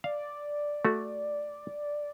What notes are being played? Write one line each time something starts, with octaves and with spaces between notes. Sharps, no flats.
D5 F5
A3 F#4